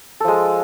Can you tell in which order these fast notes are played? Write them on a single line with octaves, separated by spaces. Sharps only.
A4 F3 G#3